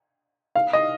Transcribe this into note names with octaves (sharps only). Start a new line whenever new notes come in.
F5
D#5